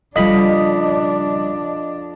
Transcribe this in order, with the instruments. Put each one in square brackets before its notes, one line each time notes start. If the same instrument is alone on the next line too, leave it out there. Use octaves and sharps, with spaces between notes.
[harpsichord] F2 B5 [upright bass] C#3 G3 [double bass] D4 [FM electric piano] D#5